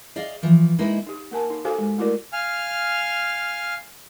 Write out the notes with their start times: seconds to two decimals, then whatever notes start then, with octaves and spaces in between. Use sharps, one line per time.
0.16 G#4 D5 D#5 F5
0.43 E3 F3
0.78 G#3 A#3 D#4 E4 B4
1.07 D#4 G4
1.31 A#3 A#4 G#5 A5
1.50 D#4
1.65 F#4 G4 A4 C5 F5 G#5
1.79 G#3 G#5
1.98 A3 E4 F#4 A#4 D5
2.33 F5 G#5 F6